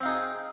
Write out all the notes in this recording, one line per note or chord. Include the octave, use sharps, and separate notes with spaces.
C4 D#4 G#4 F5